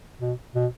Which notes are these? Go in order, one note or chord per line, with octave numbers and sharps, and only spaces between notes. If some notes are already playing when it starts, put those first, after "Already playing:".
B2
B2